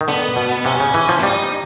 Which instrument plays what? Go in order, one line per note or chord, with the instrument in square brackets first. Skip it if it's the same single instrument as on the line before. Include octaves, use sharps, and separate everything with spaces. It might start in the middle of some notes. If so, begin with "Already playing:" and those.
[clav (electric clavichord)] D#3
[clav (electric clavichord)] D3 [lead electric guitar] B3
[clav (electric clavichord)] B2
[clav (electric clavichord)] C3 [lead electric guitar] C#4
[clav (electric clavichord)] C#3
E3
F3
[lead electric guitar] E4
[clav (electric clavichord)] G3 [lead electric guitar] D#4